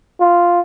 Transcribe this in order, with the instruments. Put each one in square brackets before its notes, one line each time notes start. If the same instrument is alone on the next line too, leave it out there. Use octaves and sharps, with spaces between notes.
[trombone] F4